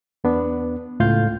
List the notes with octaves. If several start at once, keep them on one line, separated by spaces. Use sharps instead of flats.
E2 B3 D4
C#2 A2 F4 F5 G6